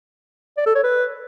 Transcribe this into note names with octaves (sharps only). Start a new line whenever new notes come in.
D5
A4
C#5
B4